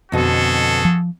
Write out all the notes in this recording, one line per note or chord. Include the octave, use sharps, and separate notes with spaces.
F2 B2 D3 F#4 G#4 A4
F3